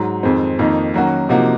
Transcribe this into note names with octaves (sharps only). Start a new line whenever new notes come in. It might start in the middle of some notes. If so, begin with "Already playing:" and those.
Already playing: G#2 F#3
F2 D#3 G#3 C4
F2 D#3 A#3 D#4
D#3 F#3 A#3 C#4 F#4
C3 F3 A#3 D#4 F#4